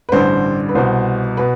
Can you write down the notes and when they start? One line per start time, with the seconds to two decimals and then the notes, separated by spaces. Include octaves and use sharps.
0.09 B4
0.12 A1 G2 D3 C5
0.69 B4
0.75 C2 B2 C5
1.37 B2 B4